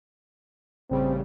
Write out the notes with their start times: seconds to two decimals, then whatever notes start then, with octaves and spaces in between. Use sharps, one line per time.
0.90 A1 C#3 G3 C4